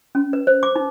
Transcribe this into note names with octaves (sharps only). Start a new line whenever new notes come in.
C#4
B4
C5
D6
D#4